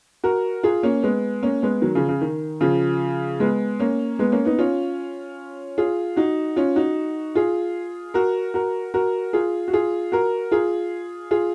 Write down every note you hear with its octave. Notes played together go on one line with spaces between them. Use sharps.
F#4 A#4
F4 G#4
A#3 C#4
G#3 B3
A#3 C#4
G#3 B3
D#3 F#3
C#3 F3
C#3
D#3
C#3 F3
G#3 B3
A#3 C#4
G#3 B3
A#3 C#4
B3 D#4
C#4 F4
F4 G#4
D#4 F#4
C#4 F4
D#4 F#4
F4 G#4
F#4 A#4
F#4 A#4
F#4 A#4
F4 G#4
F#4
F4 G#4
F#4 A#4
F4 G#4
F4 G#4